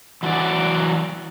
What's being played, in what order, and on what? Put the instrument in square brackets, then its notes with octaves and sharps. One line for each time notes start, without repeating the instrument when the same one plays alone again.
[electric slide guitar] E3 F#3 F#4 A4 D5